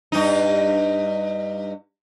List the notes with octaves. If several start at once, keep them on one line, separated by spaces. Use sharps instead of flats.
G2 D#4